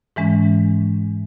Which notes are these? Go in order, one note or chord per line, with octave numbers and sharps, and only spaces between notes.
G#2 E3 G#3 C#4